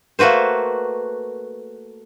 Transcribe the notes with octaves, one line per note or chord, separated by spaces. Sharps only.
A3 A#3 F#4 B4 C5